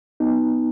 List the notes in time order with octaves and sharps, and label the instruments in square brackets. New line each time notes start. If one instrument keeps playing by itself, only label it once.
[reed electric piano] B3 D#4